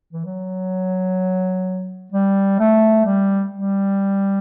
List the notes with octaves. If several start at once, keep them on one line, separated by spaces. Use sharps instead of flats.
E3
F#3
G3
A3
G3
G3